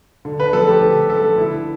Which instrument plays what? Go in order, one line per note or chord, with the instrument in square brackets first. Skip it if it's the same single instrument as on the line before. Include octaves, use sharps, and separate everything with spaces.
[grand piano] D3
B4
F3 A3 A4
G4
D3
F3 A3 A4
D3 E4